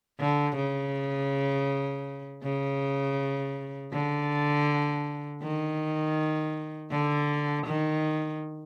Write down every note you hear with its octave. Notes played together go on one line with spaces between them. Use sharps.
D3
C#3
C#3
D3
D#3
D3
D#3